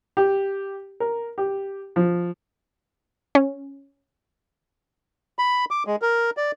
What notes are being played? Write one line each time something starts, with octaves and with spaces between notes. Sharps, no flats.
G4
A#4
G4
F3
C#4
B5
D6
G#3
A#4
D5